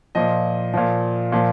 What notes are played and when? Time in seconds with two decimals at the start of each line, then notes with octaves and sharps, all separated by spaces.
0.15 A#2 F3 D#5
0.74 A#2 F3
1.32 A#2 F3